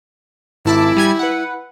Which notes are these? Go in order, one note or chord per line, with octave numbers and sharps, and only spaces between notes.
G#1 E4 A5 D6
G3 G#5 G#6
B4 F#5